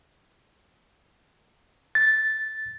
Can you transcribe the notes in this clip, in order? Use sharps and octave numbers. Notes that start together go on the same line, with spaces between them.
A6